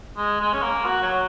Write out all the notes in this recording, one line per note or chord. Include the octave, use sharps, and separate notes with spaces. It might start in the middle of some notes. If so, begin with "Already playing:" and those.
G#3
G#3
C#4
A#3
F#4
F#3